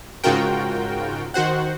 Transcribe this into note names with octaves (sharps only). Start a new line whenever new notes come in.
G#2 C#3 F4 F#4 A#4 G5
D#3 F#4 C5 F#5